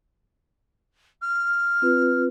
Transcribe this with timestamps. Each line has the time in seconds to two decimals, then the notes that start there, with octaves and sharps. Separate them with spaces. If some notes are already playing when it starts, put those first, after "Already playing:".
1.22 F6
1.82 C4 F4 B4